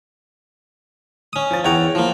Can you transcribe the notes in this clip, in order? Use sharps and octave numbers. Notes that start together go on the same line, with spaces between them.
C#4 D#6
F3 A6
E2 C#5 F#5 G5 A#5
F3 A#3